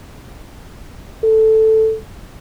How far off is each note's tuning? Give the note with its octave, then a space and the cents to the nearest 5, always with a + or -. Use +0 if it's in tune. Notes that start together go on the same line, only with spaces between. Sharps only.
A4 +0